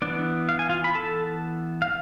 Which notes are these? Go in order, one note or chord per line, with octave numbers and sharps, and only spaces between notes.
E3 B3 D4 D5
F5
G#5
F4 F5
B5
A4 A5
F5